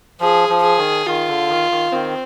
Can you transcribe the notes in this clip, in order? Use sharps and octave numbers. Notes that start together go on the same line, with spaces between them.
F3 G#4
F3
G#4
D#3
D#3 F4
D3
D#3
D#3
D#3 C4